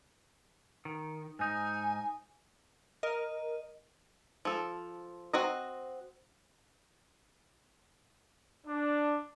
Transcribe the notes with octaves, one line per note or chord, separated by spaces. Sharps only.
D#3
G#2 D#4 G#5
A#4 D#5
F3 A4
C4 F#4 D#5
D4